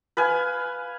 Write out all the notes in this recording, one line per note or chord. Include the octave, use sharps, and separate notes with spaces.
B4 F5 G#5